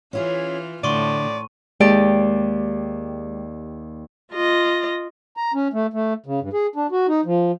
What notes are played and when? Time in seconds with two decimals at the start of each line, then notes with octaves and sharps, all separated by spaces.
0.13 E3 C#4 E4 F4 G#4
0.84 A2 D3 D5 C6 C#6 D#7
1.80 D#2 G#3 G4 D5
4.31 F4 D#5
5.37 A#5
5.54 C#4
5.73 A3
5.94 A3
6.26 C#3
6.41 G2
6.53 G#4
6.76 D4
6.92 F#4
7.08 D#4
7.25 F3